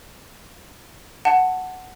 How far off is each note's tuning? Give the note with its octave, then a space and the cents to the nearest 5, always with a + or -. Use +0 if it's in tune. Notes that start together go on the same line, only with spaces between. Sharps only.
F#5 +0 A5 +10